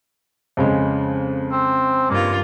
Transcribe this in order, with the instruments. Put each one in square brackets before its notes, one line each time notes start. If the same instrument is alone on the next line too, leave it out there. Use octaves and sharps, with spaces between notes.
[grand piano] F2 C#3 G#3
[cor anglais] C4
[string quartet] G2 D#3 F4 [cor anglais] A#3